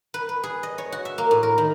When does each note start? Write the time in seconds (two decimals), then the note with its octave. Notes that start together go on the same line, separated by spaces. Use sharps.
0.14 B4
0.29 B4
0.43 G#4
0.63 D#5
0.78 C#5
0.92 F#4
1.05 E5
1.18 A#3
1.31 A2
1.43 A#4
1.58 D#3